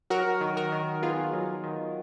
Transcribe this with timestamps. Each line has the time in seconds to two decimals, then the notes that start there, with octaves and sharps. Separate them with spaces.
0.10 F#3 F#4 A#4
0.41 D#3
0.57 F#4 A#4
0.72 D#3
1.02 B3 F4 G#4
1.33 F#3
1.64 D#3